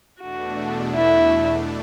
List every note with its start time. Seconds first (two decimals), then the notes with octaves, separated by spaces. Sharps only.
0.21 E2 B2 A3 D4 F#4
0.95 E4